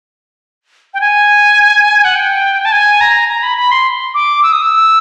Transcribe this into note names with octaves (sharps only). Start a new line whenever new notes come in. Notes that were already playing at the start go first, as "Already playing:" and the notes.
G5
G#5
F#5
G5
A5
G#5
A#5
A#5
B5
B5
C6
D6
E6
D#6
E6